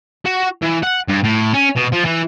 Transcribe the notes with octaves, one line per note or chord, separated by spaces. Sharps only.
F#4
E3
F#5
G2
A2
C#4
B2
F3
E3